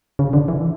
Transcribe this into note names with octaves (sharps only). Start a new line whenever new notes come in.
C#3
D3
E3